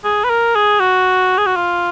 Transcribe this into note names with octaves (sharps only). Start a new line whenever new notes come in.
G#4
B4
A#4
G#4
F#4
G#4
F#4
F4